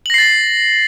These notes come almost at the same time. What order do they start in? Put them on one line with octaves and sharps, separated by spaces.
F#7 A#6 C7 A6